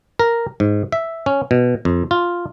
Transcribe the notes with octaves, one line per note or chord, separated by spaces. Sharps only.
A#4
G#2
E5
C#4
B2
F2
F4